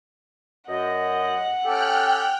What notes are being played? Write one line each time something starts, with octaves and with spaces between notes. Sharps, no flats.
F#2 D#5 F#5
C#4 G4 A4 G5 F6 F#6